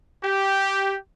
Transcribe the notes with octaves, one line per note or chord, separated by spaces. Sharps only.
G4